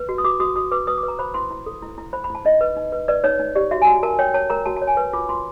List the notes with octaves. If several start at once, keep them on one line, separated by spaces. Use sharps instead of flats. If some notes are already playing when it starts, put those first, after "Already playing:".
Already playing: B4
F#4
D#6
F#4 D6
F#4 D#6
F#4 D#6
B4 D6
B4 D#6
D6
B4
A#5
C5 B5
E4 C6
E4
A4
E4
E4
C5 B5
B5
E4 A5
D#4 D#5
B4
D#4
B4
B4 D5
D#4 C#5
D#4
G4 D5
F#4 E5
G#5
F#4
A#4 A5
C#5 G5
C#5 A5
A#4 A#5
F#4 A5
A5
C#5
G#5
B4
F4 D6
F4 C6